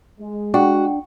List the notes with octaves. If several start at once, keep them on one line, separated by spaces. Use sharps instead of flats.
G#3
D4 F#4 G5